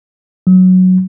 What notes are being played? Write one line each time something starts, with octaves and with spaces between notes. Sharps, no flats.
F#3